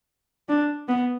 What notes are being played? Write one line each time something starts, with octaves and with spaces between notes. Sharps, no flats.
D4
B3